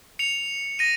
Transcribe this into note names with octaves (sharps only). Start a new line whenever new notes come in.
C#7 F7
A#6 D#7